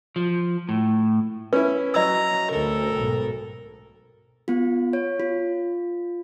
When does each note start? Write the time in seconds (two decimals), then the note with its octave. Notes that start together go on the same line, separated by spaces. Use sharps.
0.16 F3
0.69 A2
1.53 C#4 E4 B4
1.94 F#3 D#5 A#5 E6
2.51 D2 A4 A#4
2.94 B1 G#2
4.48 B3 F4
4.93 C#5
5.20 F4